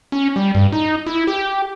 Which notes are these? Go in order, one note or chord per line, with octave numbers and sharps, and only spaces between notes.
C#4
G3
G2
D#4
E4
G4